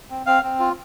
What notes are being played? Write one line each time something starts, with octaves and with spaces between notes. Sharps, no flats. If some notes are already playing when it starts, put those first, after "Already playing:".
C4
C4 F5
C4
F4